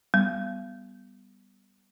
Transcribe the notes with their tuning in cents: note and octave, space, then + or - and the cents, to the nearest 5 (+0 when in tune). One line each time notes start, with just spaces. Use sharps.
G3 +0 B3 +0